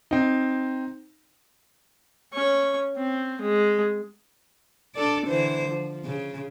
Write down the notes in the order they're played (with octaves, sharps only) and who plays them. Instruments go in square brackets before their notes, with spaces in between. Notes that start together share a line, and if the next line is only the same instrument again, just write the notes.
[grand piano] C4 D#4
[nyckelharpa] C#4 C#6
C4
G#3
[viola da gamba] D4 A4 D5
D3 E3 C5
F3
C#3